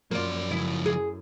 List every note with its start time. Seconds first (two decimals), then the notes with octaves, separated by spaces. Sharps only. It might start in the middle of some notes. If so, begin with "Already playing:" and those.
0.11 F#2 F3 A#3 F4 D5
0.51 C#3 F3 E4
0.86 G#4